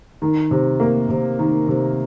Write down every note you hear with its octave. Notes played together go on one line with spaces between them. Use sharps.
D#3
C3
A#3
C3
D#3
C3